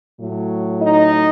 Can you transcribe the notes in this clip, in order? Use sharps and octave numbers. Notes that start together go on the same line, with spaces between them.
A2 F#3
D#4 D#5